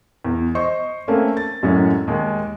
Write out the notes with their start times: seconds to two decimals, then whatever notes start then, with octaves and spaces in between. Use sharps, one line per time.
0.25 E2
0.55 C5 D#5 C#6
1.08 A3 A#3 C4 C#4
1.37 A6
1.63 F#2 A2 F#3 G#3 C#4
2.07 D#2 G#3